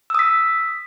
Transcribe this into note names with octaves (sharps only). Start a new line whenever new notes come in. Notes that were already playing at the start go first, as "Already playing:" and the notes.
D#6 E6 B6